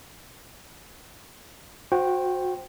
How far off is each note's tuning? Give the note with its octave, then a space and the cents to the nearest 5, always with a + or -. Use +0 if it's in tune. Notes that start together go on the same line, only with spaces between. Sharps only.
F#4 -25 C5 +0 G5 +0